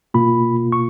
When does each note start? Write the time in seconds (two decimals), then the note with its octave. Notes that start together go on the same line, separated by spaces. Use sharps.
0.14 B2 A#3 F4 B5
0.72 C#6